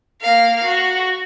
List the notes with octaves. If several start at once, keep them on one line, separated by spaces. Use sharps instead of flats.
A#3 F5
F#4